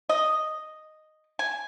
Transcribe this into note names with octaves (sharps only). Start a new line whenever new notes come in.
D#5
G#5